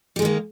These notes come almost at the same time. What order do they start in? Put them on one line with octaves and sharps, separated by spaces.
G3 G#3 D#3 A#3